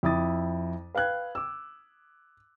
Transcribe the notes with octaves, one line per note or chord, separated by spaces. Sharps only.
F2 E4 D6 D#6 A6
B4 F5 G5 F#6 G#6
D6 E6